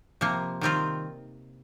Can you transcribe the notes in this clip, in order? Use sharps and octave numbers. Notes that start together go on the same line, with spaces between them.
C3 F3 A#3
D#3 G3 C4 F4